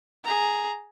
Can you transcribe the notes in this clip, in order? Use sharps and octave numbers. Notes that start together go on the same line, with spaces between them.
G#4 A#5